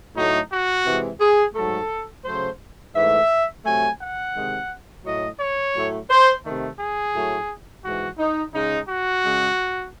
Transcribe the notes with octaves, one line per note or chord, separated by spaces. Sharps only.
A2 F#3 A3 D#4
F#4
C3 E3 G#3
G#4
G#2 F#3 A3 A4
C#3 F#3 A3 C5
G#2 E3 A3 E5
C3 F#3 A3 G#5
F#5
C3 D#3 G#3
A2 F#3 A3 D#5
C#5
A2 F#3 A3
C5
C3 D#3 A3
G#4
A2 F#3 A3
G#2 E3 G#3 F#4
D#4
C#3 G#3 D#4
F#4
C#3 G#3